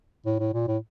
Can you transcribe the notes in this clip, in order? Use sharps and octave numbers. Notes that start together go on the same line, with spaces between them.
A2
A2
A#2
A2